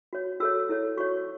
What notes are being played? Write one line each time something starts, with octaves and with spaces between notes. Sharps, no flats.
F#4 C#5
F#4 A4 C#5 E6
E4 A4 C#5
F#4 C#5 C#6